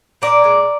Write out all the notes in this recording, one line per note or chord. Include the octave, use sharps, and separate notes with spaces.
A#2 A#4 D5
G#3